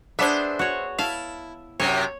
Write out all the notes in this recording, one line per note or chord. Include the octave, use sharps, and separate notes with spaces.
B3 D4 G#4 C5 E5
F#4 C#5
E4 F5 A5
F#2 C3 C#5